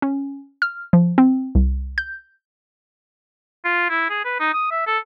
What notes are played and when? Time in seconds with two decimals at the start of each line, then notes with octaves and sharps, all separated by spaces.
0.02 C#4
0.62 F6
0.93 F3
1.18 C4
1.55 C2
1.98 G6
3.65 F4
3.90 E4
4.10 G#4
4.25 B4
4.40 D#4
4.53 D#6
4.71 E5
4.87 A4